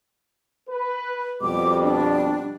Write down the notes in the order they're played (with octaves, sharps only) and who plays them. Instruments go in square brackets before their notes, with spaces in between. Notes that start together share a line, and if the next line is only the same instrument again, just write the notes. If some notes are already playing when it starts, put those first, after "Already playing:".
[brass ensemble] B4
[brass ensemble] F2 B2 G3 [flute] D6
[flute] D4